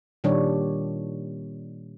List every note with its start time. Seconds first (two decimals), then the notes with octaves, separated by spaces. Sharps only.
0.24 A#2 D#3 G3 D4 C#5